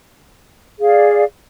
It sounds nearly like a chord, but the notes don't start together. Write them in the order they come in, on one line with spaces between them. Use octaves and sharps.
G#4 F5 D5